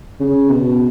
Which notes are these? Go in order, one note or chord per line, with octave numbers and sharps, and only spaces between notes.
C#3
B2